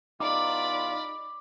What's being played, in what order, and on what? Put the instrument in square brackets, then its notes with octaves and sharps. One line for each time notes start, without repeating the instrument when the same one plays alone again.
[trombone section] E2 B2 F4 [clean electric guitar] D#4 [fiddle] D5 B5 [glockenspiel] D6